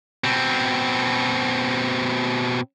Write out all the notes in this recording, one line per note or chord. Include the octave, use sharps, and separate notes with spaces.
B2 C4